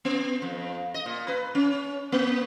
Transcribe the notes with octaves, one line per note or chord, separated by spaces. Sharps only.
B3
F2
D#5
A#2
B4
C#4
A#3